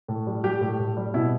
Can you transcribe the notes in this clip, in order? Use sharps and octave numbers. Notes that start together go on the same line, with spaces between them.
A2
G3
G3 G4
A2
A2
G3
B2 E4